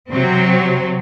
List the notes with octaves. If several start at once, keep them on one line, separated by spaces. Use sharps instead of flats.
C3 F#3 C4